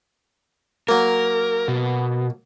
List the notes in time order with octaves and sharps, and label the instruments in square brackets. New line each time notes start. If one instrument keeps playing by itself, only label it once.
[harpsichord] F#3 A#3 [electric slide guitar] A#4
[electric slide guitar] B2